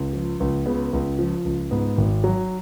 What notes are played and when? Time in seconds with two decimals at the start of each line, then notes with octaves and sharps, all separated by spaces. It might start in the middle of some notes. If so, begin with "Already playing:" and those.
Already playing: C#2
0.13 F3
0.40 C#2
0.66 C#3 B3
0.93 C#2
1.19 F3
1.45 C#2
1.71 G#2 B3
1.98 G#1
2.24 F#3